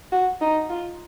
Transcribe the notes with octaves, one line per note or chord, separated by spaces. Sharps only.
F#4
D#4
F4